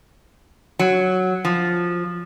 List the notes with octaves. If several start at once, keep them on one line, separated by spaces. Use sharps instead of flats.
F#3
F3